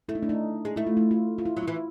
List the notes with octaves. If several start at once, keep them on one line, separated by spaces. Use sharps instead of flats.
A3 E4
D#4
D4
D#4
G#3
A3 E4
F4
E4
F4
F4
E4
F#3
E4
E3